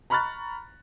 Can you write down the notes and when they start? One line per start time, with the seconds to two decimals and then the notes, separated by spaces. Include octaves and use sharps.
0.10 A#5 B5 C#6 F6 F#6 A6